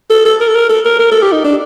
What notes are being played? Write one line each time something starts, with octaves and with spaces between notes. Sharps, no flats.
A4
A4
A#4
A4
A#4
A4
A#4
A#4
A4
G4
D#4
D4